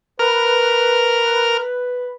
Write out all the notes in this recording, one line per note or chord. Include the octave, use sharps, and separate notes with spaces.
A#4 B4 F6